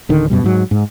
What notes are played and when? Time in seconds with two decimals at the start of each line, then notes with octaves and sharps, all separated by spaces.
0.09 D1 D3 D#3
0.30 F#2 B2 G3
0.44 G#2 F#3
0.71 G#2